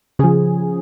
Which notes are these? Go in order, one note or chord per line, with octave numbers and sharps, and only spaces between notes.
C#3 F3 G#4